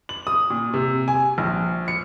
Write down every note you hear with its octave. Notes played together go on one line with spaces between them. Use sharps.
F#7
D#6
A#2
C3
G#5
A#1
C#7